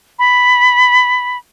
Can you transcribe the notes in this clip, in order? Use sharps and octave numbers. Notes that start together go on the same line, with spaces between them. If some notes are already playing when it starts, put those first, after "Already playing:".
B5